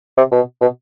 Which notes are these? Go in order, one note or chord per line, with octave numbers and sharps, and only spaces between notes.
C3
B2
B2